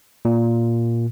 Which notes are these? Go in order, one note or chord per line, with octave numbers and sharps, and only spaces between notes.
A#2